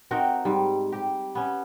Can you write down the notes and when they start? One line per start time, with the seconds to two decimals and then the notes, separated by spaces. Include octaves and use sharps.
0.11 C4 D#4 F#4 A#4
0.45 G#2 G3
0.92 G4
1.35 B3 C#4